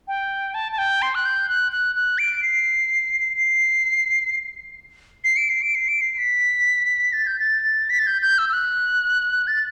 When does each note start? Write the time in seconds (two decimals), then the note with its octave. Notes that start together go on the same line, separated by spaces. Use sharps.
0.08 G5
0.54 A5
0.72 A5
0.78 G5
1.02 C6
1.15 F#6
1.25 G6
1.49 F#6
1.72 F#6
1.96 F#6
2.18 D7
2.42 C7
3.37 C7
5.24 C7
5.37 D7
5.50 C7
5.62 D7
5.75 C7
5.88 D7
6.01 C7
6.18 B6
7.13 A6
7.27 G6
7.40 A6
7.90 B6
7.99 A6
8.07 G6
8.22 G6
8.38 E6
8.49 E6
8.53 F#6
9.47 A6